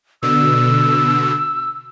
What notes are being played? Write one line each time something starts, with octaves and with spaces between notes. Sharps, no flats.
B2 D3 E6